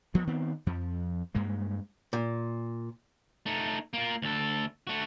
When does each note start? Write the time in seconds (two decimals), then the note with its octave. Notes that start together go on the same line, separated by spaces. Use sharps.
0.14 D2 F3 B3
0.27 D#3 B3 C4
0.66 F2 F3
1.35 G2 G#3 A#3
2.13 A#2
3.46 A3 D#4
3.94 A#3 F4
4.22 D2 A4
4.87 A3 F#4